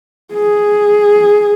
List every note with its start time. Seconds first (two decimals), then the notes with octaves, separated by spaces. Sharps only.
0.34 G#4